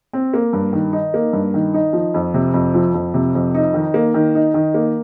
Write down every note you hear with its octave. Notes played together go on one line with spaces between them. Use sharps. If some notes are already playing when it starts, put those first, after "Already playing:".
C4
A#3
G2
D#3
D#4
A#3
G2
D#3
D#4
F3
F2
C3
F2
F3
F2
C3
F2
D#4
D#3
A#3
D#3
D#4
D#3
A#3